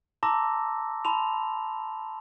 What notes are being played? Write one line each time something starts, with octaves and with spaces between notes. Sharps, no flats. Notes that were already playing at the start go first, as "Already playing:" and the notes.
A5 A#5 C6 D6 E6 A#6
A5 B5 C6 F7